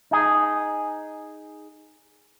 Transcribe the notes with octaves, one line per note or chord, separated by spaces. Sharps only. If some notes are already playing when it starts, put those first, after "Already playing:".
D#4 G#4